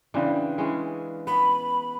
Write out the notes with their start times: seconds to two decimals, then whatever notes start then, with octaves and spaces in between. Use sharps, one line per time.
0.14 C#3 E3 C4 D4
0.58 E3 G#3 C#4
1.27 B3 B5